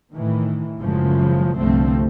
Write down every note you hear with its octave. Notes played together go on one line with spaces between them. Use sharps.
A2 D#3 E3
F#1 F#2 C#3 E3 F3 G#3
C2 G2 D3 F3 A3 C4